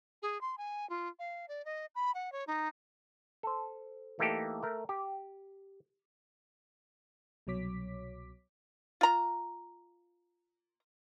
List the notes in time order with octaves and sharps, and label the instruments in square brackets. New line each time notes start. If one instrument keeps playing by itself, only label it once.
[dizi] G#4
C6
G#5
F4
F5
D5
D#5
B5
F#5
C#5
D#4
[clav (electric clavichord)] A4 C5
E3 A3 A#3 D#4 G4 A4
A3 A#4
G4
[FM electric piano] C2 B2 F#3 C#5 D6 B6
[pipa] F4 A#5